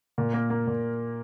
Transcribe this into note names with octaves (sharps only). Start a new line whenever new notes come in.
A#2
A#3
A#3
A#2